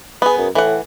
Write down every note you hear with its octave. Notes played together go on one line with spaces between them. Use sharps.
B3 G#4 B4
F#2
A2 E3 F#5